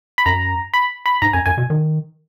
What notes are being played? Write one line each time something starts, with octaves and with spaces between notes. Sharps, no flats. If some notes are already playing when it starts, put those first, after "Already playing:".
B5
F#2 A#5
B5
B5
G#2 A#5
F#2 G#5
F#2 G#5
B2
D#3